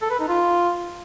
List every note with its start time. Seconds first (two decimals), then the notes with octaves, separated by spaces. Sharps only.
0.02 A4
0.11 B4
0.19 D#4
0.28 F4